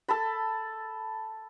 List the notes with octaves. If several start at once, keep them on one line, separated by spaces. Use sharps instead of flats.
A4 A5 B5